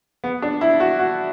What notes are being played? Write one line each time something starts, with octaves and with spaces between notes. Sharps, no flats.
B3
D4
E4
F#4
F#4